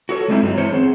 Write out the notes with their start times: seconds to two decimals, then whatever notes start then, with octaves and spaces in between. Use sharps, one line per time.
0.09 F#4 A4 C#5
0.28 G3 G#3 C4 E4
0.42 G2 F#3 D#4
0.57 E3 E4 C5 C#5
0.71 B3 C4 G#4